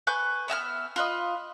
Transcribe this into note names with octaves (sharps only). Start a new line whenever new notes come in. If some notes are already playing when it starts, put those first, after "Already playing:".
B4 G#5 C#6 G6
B3 E5 G#5 F6
F4 B4 D#5